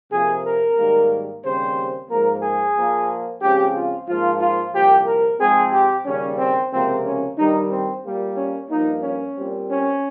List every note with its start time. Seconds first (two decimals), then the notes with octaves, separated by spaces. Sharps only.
0.11 F2 C3 F3 A#3 G#4
0.44 A#4
0.77 G#2 D#3 G3 A#3
1.43 D#2 C#3 G3 C4 C5
2.09 G#2 F3 A#3 A#4
2.42 G#4
2.75 A#2 F3 A#3
3.41 C#2 C#3 F3 C4 G4
3.74 F4
4.07 G#2 F3 A#3 F4
4.40 F4
4.73 C2 A#2 F3 G4
5.06 A#4
5.40 G#2 F3 G#3 C4 G#4
5.72 G4
6.05 D#2 C#3 G3 C#4
6.38 C4
6.71 C#2 C3 F3 A#3 C4
7.04 C#4
7.37 G2 D#3 G3 D#4
7.70 C4
8.03 A#2 G3 A#3
8.36 C#4
8.69 G2 F3 A#3 D#4
9.03 C#4
9.35 A#2 G3 C4
9.69 C#4